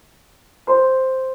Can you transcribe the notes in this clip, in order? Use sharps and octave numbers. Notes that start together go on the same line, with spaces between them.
C5 C6